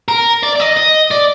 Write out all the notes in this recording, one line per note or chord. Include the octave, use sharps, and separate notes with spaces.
A#4
D5
D5
D#5
D#5
D5